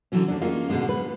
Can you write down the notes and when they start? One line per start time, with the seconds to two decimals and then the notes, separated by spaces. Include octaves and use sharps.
0.12 D3 E3 F#3 C#4
0.28 D2 D4
0.41 A#3 C#4 D#4 F4 G#4
0.70 G#2 B2 D3 G#3
0.89 B4